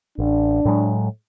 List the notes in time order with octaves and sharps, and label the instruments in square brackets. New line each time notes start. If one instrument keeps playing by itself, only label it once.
[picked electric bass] A1 [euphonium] D4
[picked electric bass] A2 F#3 G#3